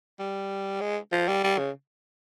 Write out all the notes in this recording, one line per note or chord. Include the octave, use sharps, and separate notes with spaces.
G3
G#3
F3
G3
G3
C#3